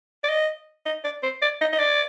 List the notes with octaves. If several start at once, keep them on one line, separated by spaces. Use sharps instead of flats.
D5
D#5
D#5
D5
C5
D5
D#5
D#5
D5